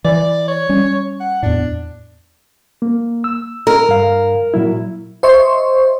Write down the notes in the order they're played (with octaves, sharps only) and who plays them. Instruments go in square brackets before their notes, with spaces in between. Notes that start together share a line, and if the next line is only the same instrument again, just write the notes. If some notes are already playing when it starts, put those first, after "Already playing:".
[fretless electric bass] E3 [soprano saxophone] D5
[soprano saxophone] C#5
[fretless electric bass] G3 C#4
[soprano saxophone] F#5
[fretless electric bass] E2 A2 [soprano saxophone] D4
[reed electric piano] A#3
E6
[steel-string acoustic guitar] A#4
[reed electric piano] G2 F5
A#2 F#3 E4
[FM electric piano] C5 D#5 E5 C6 C#6